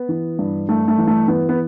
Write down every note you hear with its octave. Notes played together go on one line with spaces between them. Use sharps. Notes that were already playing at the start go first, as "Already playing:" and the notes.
Already playing: B3
E3
G2
G2 A3
A3
E3
A3
E3 B3
B3